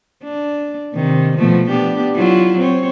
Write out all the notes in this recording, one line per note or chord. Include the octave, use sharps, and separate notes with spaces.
D4
C3 D#3
B2 F3 A3
B3 D4 G4
F#3 E4 F4
C4 C#5